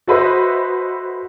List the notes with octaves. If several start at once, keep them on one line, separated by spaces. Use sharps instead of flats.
F#4 A4 B4 C5 D#5 E5